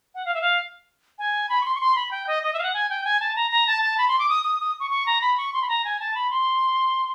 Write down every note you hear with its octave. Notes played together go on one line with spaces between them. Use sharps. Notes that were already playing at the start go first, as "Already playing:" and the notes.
F#5
F5
E5
F5
G#5
B5
C#6
C6
C#6
C6
B5
G5
D#5
D#5
E5
F5
F#5
G#5
G5
G#5
A5
A#5
A#5
A5
A5
B5
C6
D6
D#6
D#6
D#6
C#6
C#6
A#5
B5
C#6
C6
B5
A#5
G#5
A5
B5
C6